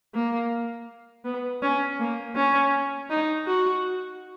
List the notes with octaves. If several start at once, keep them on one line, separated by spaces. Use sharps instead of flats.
A#3
B3
C#4
A#3
C#4
D#4
F#4